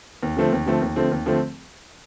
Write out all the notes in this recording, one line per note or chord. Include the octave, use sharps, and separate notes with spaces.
D#2
D3 F3 A3 C4
D#2
D3 F3 A3 C4
D#2
D3 F3 A3 C4
D#2
D3 F3 A3 C4